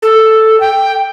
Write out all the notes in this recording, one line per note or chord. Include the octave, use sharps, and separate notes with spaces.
A4
G5